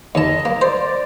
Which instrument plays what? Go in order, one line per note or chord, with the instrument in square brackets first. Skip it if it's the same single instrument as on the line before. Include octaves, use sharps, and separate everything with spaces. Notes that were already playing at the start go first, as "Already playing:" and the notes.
[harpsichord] D#2 A5 [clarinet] D#5
[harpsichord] A#3
[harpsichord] C5 [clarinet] D5
[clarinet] D5